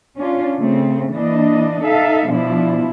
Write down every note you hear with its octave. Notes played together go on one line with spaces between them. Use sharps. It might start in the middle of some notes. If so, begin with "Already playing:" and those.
C#4 D4 F4
C#3 A3 C4
E3 A#3 D4 D#5
D#4 A4 E5 F5
B2 F3 D4 E4